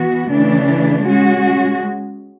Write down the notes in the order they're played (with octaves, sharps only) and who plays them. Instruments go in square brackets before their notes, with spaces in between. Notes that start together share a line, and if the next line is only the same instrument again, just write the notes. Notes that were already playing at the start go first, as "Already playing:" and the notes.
Already playing: [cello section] E3 B3 F#4
C#3 E3 A3 D4
G#3 C#4 F#4